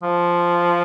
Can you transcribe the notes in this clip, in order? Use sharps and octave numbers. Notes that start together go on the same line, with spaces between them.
F3